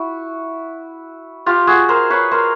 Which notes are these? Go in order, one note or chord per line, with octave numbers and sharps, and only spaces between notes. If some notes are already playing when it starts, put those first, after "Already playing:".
Already playing: E4 F#4
F4 G4
F#4 G#4
A#4 C5
B4 C#5
A#4 C5